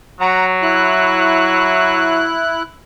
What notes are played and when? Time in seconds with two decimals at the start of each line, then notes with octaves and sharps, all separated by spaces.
0.21 F#3 F#5 A#5
0.62 E4 F#6